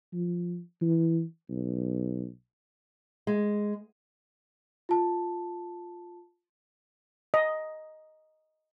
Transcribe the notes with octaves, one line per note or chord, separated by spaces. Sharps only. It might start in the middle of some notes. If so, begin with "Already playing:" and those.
F3
E3
B1
G#3
F4 A5
D#5